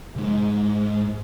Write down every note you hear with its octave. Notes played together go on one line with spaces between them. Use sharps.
C2 G#2